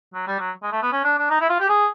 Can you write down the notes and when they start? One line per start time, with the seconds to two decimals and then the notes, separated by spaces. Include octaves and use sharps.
0.14 F#3
0.27 G3
0.39 F#3
0.63 G#3
0.72 A3
0.82 B3
0.92 C#4
1.04 D4
1.18 D4
1.30 D#4
1.41 E4
1.49 F4
1.60 G4
1.69 G#4